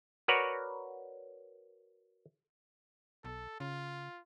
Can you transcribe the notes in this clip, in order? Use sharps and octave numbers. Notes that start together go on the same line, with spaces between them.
F#4 A#4 B4 C#5 D5 F#5
B1 A4
C#3 F4